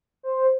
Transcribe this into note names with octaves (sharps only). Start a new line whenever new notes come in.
C5